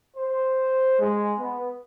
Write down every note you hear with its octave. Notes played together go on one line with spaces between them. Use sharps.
C5
G#3
B3